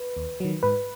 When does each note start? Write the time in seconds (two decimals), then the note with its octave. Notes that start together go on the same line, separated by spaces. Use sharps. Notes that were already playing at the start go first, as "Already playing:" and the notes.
Already playing: B4
0.17 D#2
0.40 D#3 F#3
0.63 G#2 B4